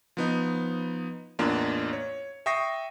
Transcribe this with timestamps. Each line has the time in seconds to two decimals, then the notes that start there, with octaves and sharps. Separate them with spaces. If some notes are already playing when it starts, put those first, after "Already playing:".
0.17 F3 B3 D#4
1.39 A1 E2 A#3 D4 F4
1.93 C#5
2.46 E5 G5 C#6 D#6 A#6 C7